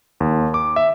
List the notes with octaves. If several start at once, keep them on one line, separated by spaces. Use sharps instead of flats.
D#2
D6
E5